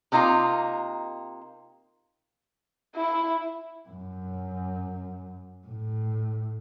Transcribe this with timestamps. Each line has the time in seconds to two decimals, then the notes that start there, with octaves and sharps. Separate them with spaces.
0.12 C3 A#3 D#4 F4 A#5
2.96 E4
3.89 F#2
5.67 A2